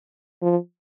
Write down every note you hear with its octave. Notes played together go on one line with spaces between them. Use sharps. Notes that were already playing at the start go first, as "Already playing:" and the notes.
F3